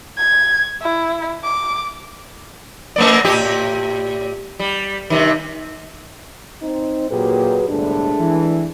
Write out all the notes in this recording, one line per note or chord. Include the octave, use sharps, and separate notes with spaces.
G#6
E4
D6
A3 A#3 D5
A2 G4
G3
G2 C3 D#3
C4 D#4
A#2 F#3 G4 G#4 B4
G1 C2 A2 G#3 A3 D4
E3